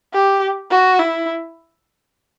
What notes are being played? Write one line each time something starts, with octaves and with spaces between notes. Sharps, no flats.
G4
F#4
E4